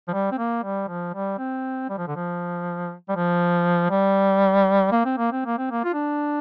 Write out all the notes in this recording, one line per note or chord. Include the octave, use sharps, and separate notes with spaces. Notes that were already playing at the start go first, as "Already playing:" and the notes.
F3
G3
C4
A#3
G3
F3
G3
C4
G3
F3
D3
F3
G3
F3
G3
A#3
C4
A#3
C4
A#3
C4
A#3
F4
D4